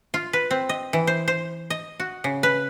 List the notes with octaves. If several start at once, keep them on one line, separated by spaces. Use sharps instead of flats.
F4
B4
C4
D#5
E3
C5
C5
D#5
F#4
C#3
B4